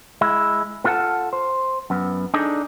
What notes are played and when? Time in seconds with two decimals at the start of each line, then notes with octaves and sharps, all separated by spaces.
0.21 G#3 E4
0.84 B3 F4 A4 F5 F#5 A5
1.33 C5
1.90 F#2 B3
2.34 D4 D#4 G#4 A4 D5